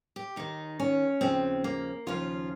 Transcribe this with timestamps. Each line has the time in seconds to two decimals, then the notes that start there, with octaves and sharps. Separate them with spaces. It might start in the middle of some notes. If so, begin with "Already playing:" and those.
0.16 G4
0.36 D#2 D#3 D#4
0.80 C#4
1.21 D#2 C#3 F3 C4
1.64 A#3
2.07 D#2 C#3 F3 F4